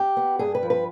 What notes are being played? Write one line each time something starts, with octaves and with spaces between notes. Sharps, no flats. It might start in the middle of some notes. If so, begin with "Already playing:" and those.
Already playing: G4
B3
G2 G#4
B4
F3
B4